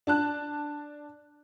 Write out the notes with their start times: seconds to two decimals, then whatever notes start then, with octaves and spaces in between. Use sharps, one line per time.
0.07 D4 A5 F#6